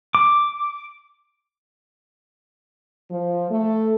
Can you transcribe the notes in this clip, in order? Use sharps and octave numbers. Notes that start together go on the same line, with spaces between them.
D6
F3
A3